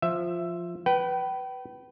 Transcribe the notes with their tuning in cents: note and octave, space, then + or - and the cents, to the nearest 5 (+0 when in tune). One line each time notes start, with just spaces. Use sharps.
F3 +0 E5 +10
B4 +0 G5 -35